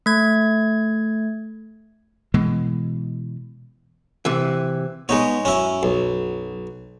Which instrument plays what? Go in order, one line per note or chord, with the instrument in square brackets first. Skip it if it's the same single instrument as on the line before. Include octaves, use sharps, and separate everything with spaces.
[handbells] A3 G#6
[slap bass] B2 E3 G#3
[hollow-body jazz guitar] C3 E3
[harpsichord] G#3 D#4 C#5 [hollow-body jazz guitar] B3
[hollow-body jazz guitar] F#2 [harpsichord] C#4 E4
[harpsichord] B1